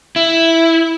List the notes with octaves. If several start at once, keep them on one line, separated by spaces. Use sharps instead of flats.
E4